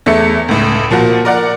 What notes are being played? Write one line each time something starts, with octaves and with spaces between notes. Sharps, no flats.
E2 A3 E5 C#7
C#2 A2
A#2 F3 A#3 F#4
A#4 D5 F#5